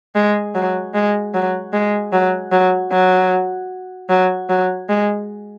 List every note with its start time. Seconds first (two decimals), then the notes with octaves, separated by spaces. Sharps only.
0.15 G#3
0.55 F#3
0.94 G#3
1.34 F#3
1.73 G#3
2.13 F#3
2.52 F#3
2.92 F#3
4.10 F#3
4.49 F#3
4.89 G#3